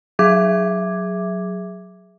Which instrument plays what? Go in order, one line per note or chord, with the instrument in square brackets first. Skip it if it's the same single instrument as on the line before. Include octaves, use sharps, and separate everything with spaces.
[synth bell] F#3 G#4 E5 D6 G#6